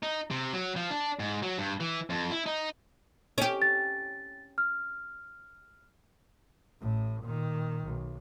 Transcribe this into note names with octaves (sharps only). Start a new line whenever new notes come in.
D#4
C3
F#3
F3
D4
G#2
F#3
G2
E3
F2
E4
D#4
C#4 G4
A6
F6
A1 A2
A#2 D#3
B1